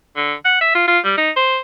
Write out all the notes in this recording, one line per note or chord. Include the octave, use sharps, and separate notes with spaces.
D3
F#5
E5
F4
F4
G3
D#4
C5